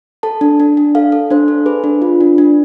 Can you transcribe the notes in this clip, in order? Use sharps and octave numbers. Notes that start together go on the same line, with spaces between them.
A4 A5
D4
D4
D4
A4 F5
A4
D4 C5
A4
G#4 B4
D4
F4
D4
D4